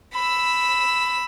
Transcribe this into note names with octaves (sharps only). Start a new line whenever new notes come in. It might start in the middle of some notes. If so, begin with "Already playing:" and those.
B5 E6